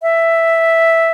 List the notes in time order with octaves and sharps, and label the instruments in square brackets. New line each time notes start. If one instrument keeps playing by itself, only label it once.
[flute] E5